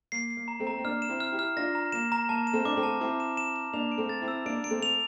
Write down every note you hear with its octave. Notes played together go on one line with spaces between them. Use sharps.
A#3 C7
C7
A#3
A#5
A3 C4
A#5
C4
A#3 D4 F6
E7
C4 E4
F6
E4 G4
F6
D4 F4 A#6
A#5
A#3 E7
A#5
A#3 A5
E7
A3 C4
D4 D6
A3 C4
A5
C4 E4 D6
E7
E7
E7
A#3 D4 F7
D7
A3 C4
A6
C4 E4
E6
A#3 D4 D7
A#3 D7
A3 C4
F7